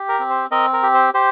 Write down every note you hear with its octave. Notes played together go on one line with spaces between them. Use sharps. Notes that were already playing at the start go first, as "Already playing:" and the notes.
Already playing: G4
A#4
C4
C5
C4 A#4 D#5
A#4
G4
C5
G4 C5